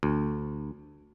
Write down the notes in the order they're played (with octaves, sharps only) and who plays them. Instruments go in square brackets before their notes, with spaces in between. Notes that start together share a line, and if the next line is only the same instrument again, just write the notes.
[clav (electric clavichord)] D2